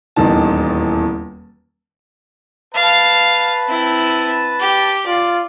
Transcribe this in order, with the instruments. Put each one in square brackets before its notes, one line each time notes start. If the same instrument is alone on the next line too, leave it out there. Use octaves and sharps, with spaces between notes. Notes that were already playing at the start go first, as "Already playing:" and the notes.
[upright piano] D#1 E2 D#3 A5
[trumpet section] B4 A5 [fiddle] F5
[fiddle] C4 E4
G4
[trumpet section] F4 [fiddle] D5